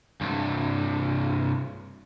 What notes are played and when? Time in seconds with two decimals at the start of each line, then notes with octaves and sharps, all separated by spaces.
0.21 C2 G2